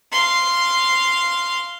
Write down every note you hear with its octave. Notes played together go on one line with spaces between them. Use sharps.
F5 C6